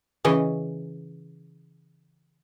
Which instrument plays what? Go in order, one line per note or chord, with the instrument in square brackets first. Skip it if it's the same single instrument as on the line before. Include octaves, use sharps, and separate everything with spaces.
[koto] C#3 E3 C#4 D#5